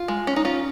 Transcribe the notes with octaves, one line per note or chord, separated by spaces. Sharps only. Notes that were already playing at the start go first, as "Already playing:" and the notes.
Already playing: F4
G#3
C#4
D#4
C#4 F4